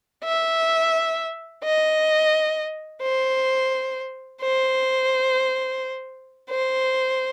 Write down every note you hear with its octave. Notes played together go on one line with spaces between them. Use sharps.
E5
D#5
C5
C5
C5